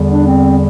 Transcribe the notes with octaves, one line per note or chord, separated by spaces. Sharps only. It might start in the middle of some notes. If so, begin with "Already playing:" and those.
Already playing: E2 D3 G3
D4
C4